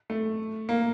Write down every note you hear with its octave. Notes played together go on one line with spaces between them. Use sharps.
A3
A#3